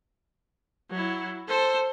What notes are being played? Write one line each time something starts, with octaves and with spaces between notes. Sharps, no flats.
F#3 E4
A4 C5